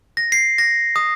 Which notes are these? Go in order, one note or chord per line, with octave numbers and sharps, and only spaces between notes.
A#6
C7
A#6
D#6